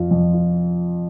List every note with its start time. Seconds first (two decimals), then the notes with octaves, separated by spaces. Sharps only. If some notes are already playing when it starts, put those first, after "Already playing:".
Already playing: F2 F4
0.11 F2
0.33 F4